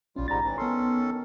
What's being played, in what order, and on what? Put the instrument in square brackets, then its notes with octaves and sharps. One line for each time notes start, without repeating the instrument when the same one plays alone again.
[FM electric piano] A#1 C#4 [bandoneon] G3 F4
[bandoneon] G#2 G3 [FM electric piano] A#5 A6
[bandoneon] A2 E3
[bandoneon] D#3 C#4 A4 [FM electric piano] B3 C6